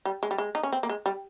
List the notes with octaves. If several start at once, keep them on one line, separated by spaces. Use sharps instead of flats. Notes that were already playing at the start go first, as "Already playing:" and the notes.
G3
G#3
G3
G#3
D#4
C#4
C4
A#3
G#3
G3